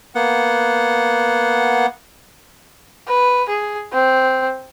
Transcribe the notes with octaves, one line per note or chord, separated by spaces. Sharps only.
A#3 B3 F#5
B4
G#4
C4